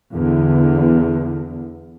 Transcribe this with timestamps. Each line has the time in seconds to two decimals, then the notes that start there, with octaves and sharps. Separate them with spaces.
0.11 E2 D3